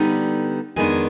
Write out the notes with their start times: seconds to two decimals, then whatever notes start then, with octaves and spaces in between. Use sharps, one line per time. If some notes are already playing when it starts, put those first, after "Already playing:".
Already playing: D3 G3 B3 D#4
0.76 F2 D#3 G#3 B3 D4 G#5